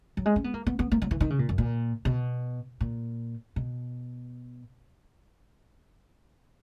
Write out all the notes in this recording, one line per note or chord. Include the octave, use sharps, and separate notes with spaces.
F#3
G#3
C#4
B3
A#3
B3
B3
A#3
F#3
E3
D#3
C#3
A#2
F#2
A#2
B2
A#2
B2